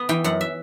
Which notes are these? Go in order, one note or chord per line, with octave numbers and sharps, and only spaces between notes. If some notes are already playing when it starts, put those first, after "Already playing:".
Already playing: B3
E3 G5
F#2 F#5
E5